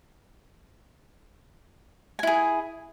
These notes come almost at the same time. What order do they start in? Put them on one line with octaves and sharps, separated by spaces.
G#5 E4 G#4